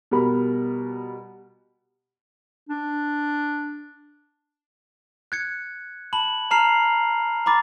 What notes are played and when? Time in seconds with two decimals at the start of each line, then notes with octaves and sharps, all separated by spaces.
0.11 B2 G3 A#4 B5
2.69 D4
5.32 F#6 G#6 C#7
6.13 A5 B5 F#7
6.51 A5 A#5 F6 C7 F7
7.46 A#5 B5 D6 A6